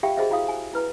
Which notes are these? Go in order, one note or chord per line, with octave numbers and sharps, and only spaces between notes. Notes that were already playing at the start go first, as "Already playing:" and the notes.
F4 G4 E5 F5 G5
F#4 G#4 C5 D#5 E5
E4 F#4 F5 D#6
G#5
E4 B4 A#5